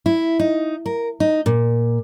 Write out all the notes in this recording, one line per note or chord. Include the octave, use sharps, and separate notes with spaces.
E4
D#4
A#4
D#4
A#2